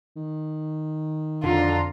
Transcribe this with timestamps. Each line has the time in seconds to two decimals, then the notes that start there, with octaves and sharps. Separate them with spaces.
0.16 D#3
1.44 F2 D3 D4 F4 A#5